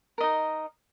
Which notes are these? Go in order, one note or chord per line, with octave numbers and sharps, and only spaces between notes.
D#4 A#4 D#5